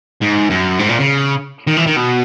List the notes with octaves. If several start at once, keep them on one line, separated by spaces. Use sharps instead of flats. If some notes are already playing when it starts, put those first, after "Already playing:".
G#2
F#2
G#2
A#2
C#3
D#3
E3
D#3
B2